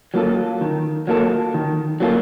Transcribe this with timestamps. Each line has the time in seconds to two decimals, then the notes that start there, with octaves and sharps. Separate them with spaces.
0.14 F#3 A#3 F4 A4
0.61 D#3
1.07 F#3 A#3 F4 A4
1.54 D#3
2.00 F#3 A#3 F4 A4